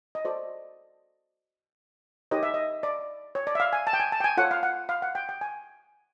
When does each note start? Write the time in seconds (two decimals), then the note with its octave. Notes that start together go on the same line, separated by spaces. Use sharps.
0.15 D#5
0.25 F#4 A4 C5 D5
2.31 D#4 G4 A#4 C#5 D#5
2.43 E5
2.54 D#5
2.83 D5
3.35 C#5
3.47 D5
3.55 E5
3.60 F5
3.73 G#5
3.87 A5
3.93 G5
4.00 G#5
4.12 A5
4.20 G5
4.24 G#5
4.37 F4 A4 C#5 F#5
4.51 F5
4.63 F#5
4.89 F5
5.02 F#5
5.15 G5
5.29 G5
5.41 G#5